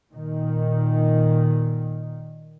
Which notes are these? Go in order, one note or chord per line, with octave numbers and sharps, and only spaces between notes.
A#2 D#3